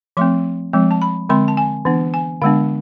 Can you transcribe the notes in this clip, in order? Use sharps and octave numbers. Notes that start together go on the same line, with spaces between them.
F3 A3 C4 C6
F3 G#3 C4
A5
B5
D3 G#3 C4 C6
A5
G#5
E3 B3 D4
G#5
D3 G#3 B3 D4 F5